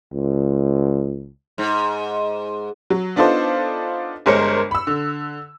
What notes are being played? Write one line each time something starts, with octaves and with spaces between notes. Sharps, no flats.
C#2
G#2
F#3
B3 D4 D#4 F4 A4 C5
G1 G#3 A#4 C5 C#5 C#7
B5 E6
D3